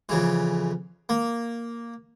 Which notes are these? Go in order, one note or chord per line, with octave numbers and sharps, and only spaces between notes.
F2 C#3 E3
A#3